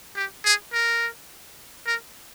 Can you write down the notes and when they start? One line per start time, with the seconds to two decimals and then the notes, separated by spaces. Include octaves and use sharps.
0.16 G4
0.45 G#4
0.73 A#4
1.86 A#4